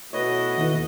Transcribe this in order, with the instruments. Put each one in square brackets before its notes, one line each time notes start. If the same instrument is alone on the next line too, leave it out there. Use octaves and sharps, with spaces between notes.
[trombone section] B2 A3 F#4 [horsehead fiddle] E4 F#5 [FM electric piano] B4 C#5 [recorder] D#5
[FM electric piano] D#2 E3